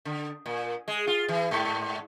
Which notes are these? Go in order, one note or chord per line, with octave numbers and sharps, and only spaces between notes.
D3
A#2
G#3
F4
E3
G#2